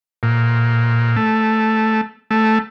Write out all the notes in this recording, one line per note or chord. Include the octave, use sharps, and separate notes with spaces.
A#2
A3
A3